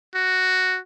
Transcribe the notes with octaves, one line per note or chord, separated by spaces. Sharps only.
F#4